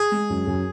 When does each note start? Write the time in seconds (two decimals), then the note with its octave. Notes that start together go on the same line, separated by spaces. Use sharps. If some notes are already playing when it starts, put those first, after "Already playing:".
Already playing: G#4
0.12 G#3
0.30 F#2
0.47 F#2